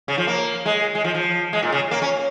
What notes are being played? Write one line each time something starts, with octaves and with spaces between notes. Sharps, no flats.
C#3
F3
A#3
G#3
G#3
F3
F3
G#3
A#2
C#3
A#3
C#4